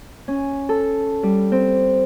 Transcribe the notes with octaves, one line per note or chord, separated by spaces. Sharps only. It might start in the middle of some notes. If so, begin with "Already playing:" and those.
C#4
A4
G3
C4